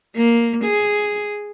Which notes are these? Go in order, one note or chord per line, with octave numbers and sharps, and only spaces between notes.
A#3
G#4